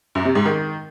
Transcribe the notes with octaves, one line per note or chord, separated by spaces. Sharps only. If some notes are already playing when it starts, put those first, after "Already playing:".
F#2
C3
G#2
D#3